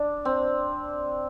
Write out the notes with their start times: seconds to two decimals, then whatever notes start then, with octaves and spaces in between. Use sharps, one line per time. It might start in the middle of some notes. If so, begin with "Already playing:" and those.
Already playing: D4
0.25 C4